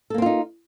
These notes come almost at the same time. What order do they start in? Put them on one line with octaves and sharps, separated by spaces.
A4 A#3 C4 F4 D#4